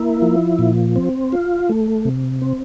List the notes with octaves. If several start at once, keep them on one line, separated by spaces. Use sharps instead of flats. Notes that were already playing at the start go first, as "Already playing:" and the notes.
Already playing: A#3 E4
F3
A#2
C4
F4
A3
C3
C4